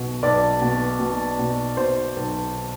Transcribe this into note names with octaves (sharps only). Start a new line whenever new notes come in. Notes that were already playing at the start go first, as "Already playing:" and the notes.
Already playing: B1 B2
B1 D5
B2
B2
B2
B2 C5
B1